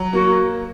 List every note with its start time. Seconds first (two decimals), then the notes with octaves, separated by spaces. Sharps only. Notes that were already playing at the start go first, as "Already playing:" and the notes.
Already playing: F#3
0.13 A#3 F#4